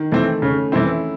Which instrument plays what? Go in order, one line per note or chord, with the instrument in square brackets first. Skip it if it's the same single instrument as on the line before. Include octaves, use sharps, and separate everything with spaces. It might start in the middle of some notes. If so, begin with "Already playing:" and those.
Already playing: [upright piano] D#3
[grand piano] E3 C4 [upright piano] A3
[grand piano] C#3 [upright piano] C#4
[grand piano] E3 C4 [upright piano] E4